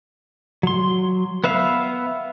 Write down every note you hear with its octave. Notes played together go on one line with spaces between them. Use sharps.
F#3 C6
B3 B4 E5 F5